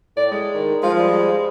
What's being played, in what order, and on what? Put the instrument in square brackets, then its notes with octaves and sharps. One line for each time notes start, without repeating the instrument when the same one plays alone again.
[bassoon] A2 [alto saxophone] D5
[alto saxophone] G#3
[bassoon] D#3
[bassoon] F3 [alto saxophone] G#3 [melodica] F4
[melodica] G3